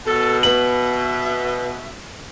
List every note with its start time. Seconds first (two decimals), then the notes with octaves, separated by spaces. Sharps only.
0.06 B2 A4
0.43 B3 E5 F#7